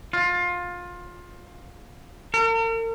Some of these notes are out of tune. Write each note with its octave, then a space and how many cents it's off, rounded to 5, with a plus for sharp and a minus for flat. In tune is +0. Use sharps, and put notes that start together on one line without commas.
F4 +20
A#4 -45